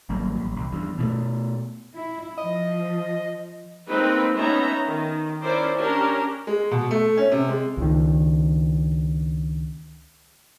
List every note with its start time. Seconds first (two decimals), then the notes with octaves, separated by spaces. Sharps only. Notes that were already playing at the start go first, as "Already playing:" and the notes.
0.09 G#1 F#3 G3 A#3
0.37 A1
0.57 C2
0.72 E2 G2
0.98 B2 D#3 A3
1.95 E4
2.38 F3 D#5
3.87 G#3 A#3 C4 D#4 B4
4.36 B3 C#4 D#4 E5 A#5
4.85 D#3
5.42 C#4 E4 A#4 C5 D5
5.75 C#4 D4 G4 A#4
6.47 G#3
6.71 B2
6.91 A3
7.17 C#4
7.32 C3
7.48 G#3
7.77 C#2 D#3